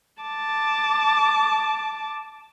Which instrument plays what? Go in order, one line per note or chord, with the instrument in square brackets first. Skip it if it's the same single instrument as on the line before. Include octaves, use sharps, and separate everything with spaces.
[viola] A5 D6